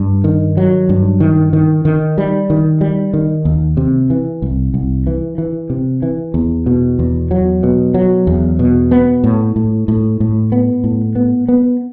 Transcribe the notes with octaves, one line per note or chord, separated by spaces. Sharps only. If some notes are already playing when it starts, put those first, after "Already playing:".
Already playing: G2
D#3
F#3
G2
D#3
D#3
D#3
G3
D#3
G3
D#3
D#2
C3
E3
C2
C2
E3
E3
C3
E3
E2
B2
E2
F#3
B2
F#3
E2
B2
B3
A2
A2
A2
A2
B3
A2
B3
B3